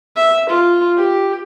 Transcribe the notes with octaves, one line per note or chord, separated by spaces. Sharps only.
E5
F4
G4